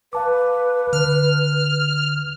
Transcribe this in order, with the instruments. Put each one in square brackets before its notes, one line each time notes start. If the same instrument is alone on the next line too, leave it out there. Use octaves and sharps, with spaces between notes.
[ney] B4 [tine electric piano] F5 A5 D6
[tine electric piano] D3 [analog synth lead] F6